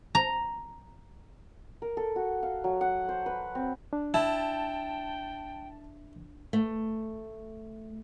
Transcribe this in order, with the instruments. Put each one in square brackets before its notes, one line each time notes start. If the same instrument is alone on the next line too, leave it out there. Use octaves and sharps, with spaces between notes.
[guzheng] A#5
[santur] A#4
A4
F#4
F5
F#3
F#5
C5
B4
C4
[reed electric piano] D4
[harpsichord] E4 [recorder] G5 [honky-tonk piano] A5
[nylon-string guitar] A3